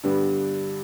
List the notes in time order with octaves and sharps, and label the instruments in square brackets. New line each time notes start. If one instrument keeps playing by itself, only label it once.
[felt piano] G2 D3 G3 B3